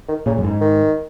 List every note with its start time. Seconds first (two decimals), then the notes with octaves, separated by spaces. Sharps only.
0.09 D#3
0.26 A#2 C#3
0.38 F#2
0.44 G#2
0.61 D#3